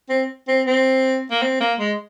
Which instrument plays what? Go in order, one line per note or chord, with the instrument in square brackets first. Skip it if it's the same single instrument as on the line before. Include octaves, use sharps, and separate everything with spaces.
[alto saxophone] C4
C4
C4
A#3
C4
A#3
G#3